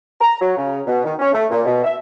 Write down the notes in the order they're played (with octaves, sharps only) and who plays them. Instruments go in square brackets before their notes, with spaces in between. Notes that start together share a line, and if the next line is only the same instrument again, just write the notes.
[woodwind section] A#5
F#3
C#3
B2
D#3
C#4
A3
A#2
B2
E5